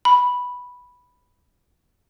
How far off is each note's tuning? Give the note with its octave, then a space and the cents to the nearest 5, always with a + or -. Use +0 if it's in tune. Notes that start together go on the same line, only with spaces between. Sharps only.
B5 -5